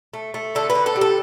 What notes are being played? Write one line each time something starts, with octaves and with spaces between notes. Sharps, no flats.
A3
A3
D3 A4
B4
D3
A4
G3
A4